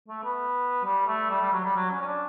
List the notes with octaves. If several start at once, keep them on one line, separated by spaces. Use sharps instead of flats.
A3
B3
G3
A3
G3
G3
F#3
G3
F#3
C#4
C#4
D4